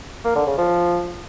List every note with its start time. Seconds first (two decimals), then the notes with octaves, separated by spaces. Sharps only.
0.25 A#3
0.36 D3
0.47 C#3
0.58 F3